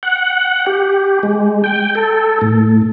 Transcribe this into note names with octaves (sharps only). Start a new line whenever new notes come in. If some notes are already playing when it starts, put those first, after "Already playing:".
F#5
G4
G#3
G5
A4
A2